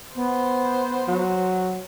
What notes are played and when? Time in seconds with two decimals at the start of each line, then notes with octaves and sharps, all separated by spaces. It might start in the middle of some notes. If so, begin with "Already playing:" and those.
0.15 B3 C5
1.08 F#3